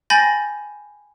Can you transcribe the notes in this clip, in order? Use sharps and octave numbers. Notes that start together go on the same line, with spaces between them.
G5 G#5 B5 G6 A6 A#6